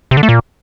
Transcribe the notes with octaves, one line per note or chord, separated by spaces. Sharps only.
C3
D3
A3
A#2